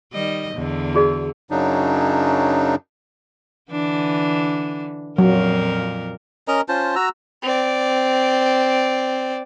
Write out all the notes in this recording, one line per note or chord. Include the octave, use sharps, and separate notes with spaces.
D#3 G3 D#5
E2 D3
F#4 G#4 D5
F#2 C#3 F#3 D4 D#4
D3 E3 D4
F2 A#2 F#3 A#4
C#4 A#4 D#5 A#5
C#4 F4 C5 A5
F#4 A#5 E6
C4 D5